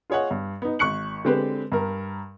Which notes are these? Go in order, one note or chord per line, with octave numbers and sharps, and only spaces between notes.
F4 G#4 C#5 D#5 F#5
G2
B3 D#4
G#1 C#6 F#6 C#7 F#7
D3 G#3 C4 G4 B4
G2 A#4